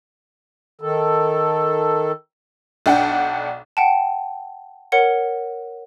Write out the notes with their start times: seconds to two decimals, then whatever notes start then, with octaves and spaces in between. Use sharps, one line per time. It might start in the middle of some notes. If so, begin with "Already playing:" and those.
0.81 D#3 A4
2.86 B1 D4 F#5 G5
3.77 F#5 G5 A5
4.92 A#4 C#5 F#5 C#7